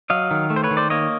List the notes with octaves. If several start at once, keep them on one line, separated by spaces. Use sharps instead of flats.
F#3 D#5 F5
D#3
A3
C5
B4 C#5
D#3
C5 D5
A#3 C#5 D#5